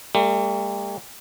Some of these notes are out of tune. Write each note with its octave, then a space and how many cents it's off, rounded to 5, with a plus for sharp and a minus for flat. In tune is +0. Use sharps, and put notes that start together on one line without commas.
G3 +35 A#3 -45